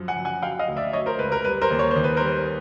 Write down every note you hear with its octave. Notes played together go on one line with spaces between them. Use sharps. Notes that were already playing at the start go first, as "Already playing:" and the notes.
Already playing: F#2 F3
F#5 G#5
F#2
F#5 G#5
F#3 F5 G5
D#5 F5
D2
D5 E5
F#3 C#5 D#5
A#4 C5
C#2 B4
A#4
G3 B4
A#4 C5
D#2
C#5
D#3 C5
B4
G3 A#4 C5